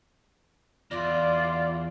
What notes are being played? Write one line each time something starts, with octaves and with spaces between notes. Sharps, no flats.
E2 F4 D5